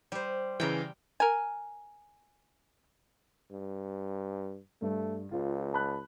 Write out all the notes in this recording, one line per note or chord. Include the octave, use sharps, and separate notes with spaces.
G3 C5
C#3 E3 G5 A#5
A#4 G#5
G2
G2 A3
C#2 F4
A5 B5 F#6